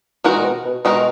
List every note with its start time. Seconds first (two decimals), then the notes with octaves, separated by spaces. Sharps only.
0.24 D#3 E3 G#3 D#4 F#4 A#4
0.37 A#2
0.45 B2
0.65 B2
0.85 B2 D#3 G#3 D#4 F#4 A#4